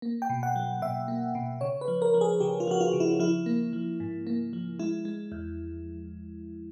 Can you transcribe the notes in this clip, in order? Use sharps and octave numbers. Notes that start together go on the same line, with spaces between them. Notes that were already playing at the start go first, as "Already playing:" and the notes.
A#3
G5
B2
F#5
F#3
B2 E5
A#3
B2
C#3 C#5
B4
F3
A#4
F3
G#4
C#3 G4
F4
F3 F#4
F4
C#3
E4
F3 E4
A#3
F3
G#2
A#3
F3
G#3 E4
G#3
E2